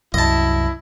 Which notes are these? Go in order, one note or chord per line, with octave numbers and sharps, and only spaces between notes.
C2 F#2 E4 D#5 A5